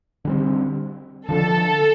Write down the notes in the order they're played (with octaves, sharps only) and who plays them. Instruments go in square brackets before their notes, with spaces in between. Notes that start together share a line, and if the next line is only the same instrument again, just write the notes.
[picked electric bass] D3 G3 C4
[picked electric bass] D3 F3 D4 [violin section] A4